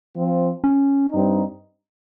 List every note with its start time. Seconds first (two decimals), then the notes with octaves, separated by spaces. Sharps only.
0.15 F3 C4 F4
0.64 C#4
1.11 G2 G3 C4 D#4